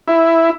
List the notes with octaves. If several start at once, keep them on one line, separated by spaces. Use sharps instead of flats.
E4